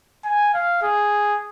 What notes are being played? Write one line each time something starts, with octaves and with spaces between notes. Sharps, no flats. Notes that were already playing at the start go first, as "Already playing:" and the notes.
G#5
F5
G#4